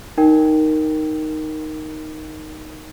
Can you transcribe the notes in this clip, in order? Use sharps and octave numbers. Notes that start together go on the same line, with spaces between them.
D#4 A#4 G5